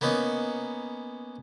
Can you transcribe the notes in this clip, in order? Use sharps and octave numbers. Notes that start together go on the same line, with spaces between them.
A#3 B3 C#4 D#4 B4